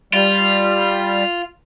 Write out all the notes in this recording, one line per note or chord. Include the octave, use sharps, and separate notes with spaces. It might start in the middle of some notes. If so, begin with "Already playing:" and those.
G3 F4